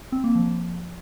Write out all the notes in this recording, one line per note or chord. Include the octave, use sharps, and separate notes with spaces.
C4
A#3
F3